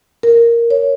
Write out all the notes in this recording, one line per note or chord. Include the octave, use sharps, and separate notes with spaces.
A#4
C#5